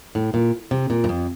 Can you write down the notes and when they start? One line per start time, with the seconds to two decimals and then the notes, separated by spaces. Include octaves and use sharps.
0.15 A2
0.34 A#2
0.71 C3
0.90 A#2
1.04 G2
1.09 F2